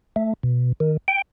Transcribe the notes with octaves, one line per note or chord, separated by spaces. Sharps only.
A3
B2
D#3
G5